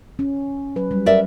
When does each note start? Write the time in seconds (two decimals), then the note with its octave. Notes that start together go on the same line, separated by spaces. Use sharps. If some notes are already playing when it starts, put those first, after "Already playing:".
0.19 C#4
0.76 F#3 B4
0.91 G3
1.06 A#4 D5 E5